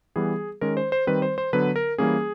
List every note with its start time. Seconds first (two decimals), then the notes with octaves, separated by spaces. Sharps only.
0.16 E3 G3 B3 G#4
0.61 D#3 G#3 C#4 A#4
0.77 C5
0.92 C5
1.07 D#3 G3 C4 B4
1.22 C5
1.38 C5
1.53 D3 F#3 B3 B4
1.76 A#4
1.98 E3 G3 A#3 C#4 G#4